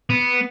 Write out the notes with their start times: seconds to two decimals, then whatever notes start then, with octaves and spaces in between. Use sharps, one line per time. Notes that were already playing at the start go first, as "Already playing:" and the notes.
0.10 B3